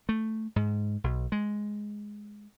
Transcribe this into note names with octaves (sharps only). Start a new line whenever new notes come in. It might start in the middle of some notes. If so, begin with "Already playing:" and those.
A3
G#2
B1
G#3